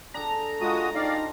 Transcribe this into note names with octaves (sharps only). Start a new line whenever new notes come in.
D4 G#4 A4 A#5
G#3 F4 F#4 G#4 D#6
D4 D#4 G4 C5 D5 F5